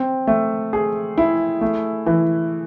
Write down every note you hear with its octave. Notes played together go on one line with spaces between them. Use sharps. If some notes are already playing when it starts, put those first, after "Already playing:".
Already playing: C4
A3
G#4
E4
A3
E3